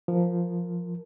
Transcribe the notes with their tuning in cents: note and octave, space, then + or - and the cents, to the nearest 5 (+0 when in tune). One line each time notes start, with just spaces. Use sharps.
F3 +0 A#4 +0